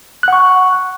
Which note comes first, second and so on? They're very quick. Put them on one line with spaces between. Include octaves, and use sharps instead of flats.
F#6 F#5 C#6